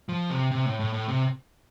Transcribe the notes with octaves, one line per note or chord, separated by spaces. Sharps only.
F3
C3
C3
A2
A2
A2
C3